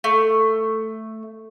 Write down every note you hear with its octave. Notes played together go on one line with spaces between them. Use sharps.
A3